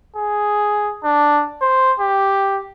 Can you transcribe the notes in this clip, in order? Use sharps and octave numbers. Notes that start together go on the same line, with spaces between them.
G#4
D4
C5
G4